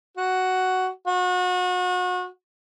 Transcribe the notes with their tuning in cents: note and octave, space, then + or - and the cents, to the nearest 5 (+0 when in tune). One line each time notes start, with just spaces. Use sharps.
F#4 +5
F#4 -35